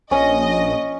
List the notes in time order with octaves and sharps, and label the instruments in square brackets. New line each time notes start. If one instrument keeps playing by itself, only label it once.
[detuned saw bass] A#1 [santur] C#4 [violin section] D#5